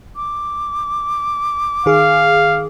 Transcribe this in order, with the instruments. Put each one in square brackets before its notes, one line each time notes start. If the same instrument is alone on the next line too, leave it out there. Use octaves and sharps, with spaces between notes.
[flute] D6
[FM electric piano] D#3 G#4 [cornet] F5